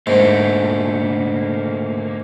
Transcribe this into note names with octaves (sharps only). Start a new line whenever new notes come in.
G#2 D3 A3 A#3